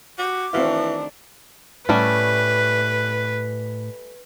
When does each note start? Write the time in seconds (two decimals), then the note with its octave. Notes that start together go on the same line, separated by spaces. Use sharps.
0.19 F#4 D6
0.53 D#3 E3 A3 C4 D4 F#4 F5
1.89 A2 G3 A3 C#4 B4